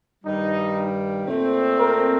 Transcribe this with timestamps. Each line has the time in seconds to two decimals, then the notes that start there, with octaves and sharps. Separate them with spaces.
0.24 G2 D#3 G3 D#4
1.26 A#2 A3 C4
1.78 A#4